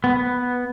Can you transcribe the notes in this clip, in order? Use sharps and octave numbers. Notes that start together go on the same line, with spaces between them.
B3